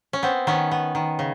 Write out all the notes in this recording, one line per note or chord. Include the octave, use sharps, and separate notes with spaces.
C#4
B3 C4
D#3 B3 C#4
B3
D#3
C#3